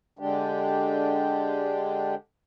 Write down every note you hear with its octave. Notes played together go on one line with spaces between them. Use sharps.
D3 G#3 D4 G4